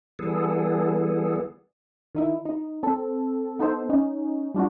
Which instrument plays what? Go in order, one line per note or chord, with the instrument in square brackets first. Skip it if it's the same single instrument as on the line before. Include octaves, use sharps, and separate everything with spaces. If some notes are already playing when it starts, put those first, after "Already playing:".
[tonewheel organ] E3 G3 B3 G#4 A4
[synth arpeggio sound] D#3 D#4 E4
D#4
C4 A4
B3 D#4 A4 C5
C#4 D#4
G3 D4 F4 F#4